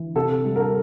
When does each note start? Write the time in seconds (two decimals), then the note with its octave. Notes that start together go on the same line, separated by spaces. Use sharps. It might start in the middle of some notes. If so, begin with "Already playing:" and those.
Already playing: E3
0.15 C3 A4
0.45 G3
0.56 A#4
0.60 A4